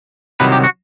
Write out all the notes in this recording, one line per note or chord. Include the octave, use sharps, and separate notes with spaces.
C2 C3 D#3 F#3 B4
G4
F#4